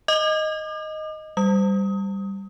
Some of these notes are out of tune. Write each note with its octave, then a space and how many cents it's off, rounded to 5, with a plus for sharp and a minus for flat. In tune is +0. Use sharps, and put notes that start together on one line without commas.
D#5 +0 D6 +45
G3 +0 D#6 +25